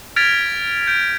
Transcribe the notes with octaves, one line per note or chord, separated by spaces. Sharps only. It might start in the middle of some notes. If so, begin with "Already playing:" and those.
F6 G#6 A6 B6 D7 F7
G6 D7